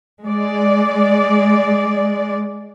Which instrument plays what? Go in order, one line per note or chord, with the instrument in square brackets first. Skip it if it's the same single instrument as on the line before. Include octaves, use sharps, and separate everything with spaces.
[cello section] G#3 D5